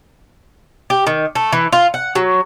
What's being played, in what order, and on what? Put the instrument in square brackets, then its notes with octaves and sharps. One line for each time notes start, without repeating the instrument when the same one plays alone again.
[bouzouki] G4
D#3
A3
E3
F4
F#5
F#3